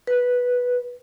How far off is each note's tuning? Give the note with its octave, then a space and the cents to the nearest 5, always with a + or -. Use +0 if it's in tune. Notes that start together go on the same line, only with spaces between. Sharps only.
B4 -5